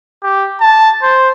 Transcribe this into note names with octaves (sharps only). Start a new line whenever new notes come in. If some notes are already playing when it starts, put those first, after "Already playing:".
G4
A5
C5